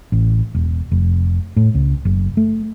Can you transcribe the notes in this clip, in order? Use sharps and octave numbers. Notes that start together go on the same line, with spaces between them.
A1
E1
F1
A2
C#2
F#1
A3